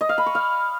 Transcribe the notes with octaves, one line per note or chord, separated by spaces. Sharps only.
D#5
F5
B5
C#6
F5